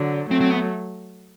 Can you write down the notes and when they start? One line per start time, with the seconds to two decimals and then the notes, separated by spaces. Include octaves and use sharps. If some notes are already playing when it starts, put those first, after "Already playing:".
Already playing: D3 F#3
0.30 F#3 A3 C4
0.41 C4
0.51 B3